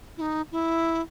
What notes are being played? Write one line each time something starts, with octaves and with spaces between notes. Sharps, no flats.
E4
D#4
E4